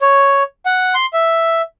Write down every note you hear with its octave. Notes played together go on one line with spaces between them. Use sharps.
C#5
F#5
C6
E5